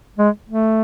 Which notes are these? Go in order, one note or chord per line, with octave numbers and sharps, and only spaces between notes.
G#3
A3